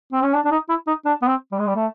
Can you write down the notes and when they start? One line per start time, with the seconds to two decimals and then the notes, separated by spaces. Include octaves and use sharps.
0.13 C4
0.23 C#4
0.34 D4
0.45 D4
0.51 D#4
0.69 E4
0.87 D#4
1.05 D4
1.22 B3
1.28 C4
1.52 G3
1.59 G#3
1.67 G3
1.76 A3